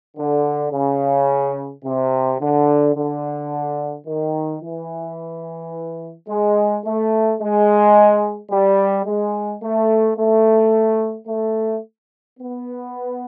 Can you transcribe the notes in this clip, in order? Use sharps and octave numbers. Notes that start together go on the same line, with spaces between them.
D3
C#3
C3
D3
D3
D#3
E3
G#3
A3
G#3
G3
G#3
A3
A3
A3
B3